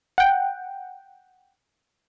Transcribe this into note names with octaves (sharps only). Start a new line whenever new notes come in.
F#5 G5